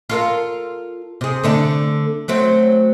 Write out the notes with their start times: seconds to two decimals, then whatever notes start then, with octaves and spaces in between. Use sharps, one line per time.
0.10 F4 A4 A#4
1.21 C3 G#4
1.44 D3 A3 D4
2.28 F#3 A3 C4